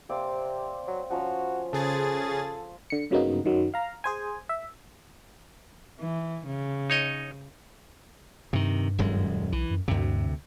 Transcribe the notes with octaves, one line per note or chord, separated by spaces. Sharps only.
C3 A#3 C4 D5
F#3
F3 C#4 F#4 A#5
C#3 G#4 A4 C5 A6
D3 C#7
G2 C#3 F#3 A#3 B3 D#4
F#2 D#3 F#3
F5 A#5
G#4 C5 G#5
E5
E3
C#3
D#4 C#5 D#5
G2 C3 D#3
D#1 F#2 G#3
B1 E3
F#2
D2 G2 C3